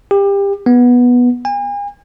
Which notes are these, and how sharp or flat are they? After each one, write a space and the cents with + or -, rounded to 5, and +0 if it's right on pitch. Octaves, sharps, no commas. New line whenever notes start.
G4 +25
B3 -10
G#5 -40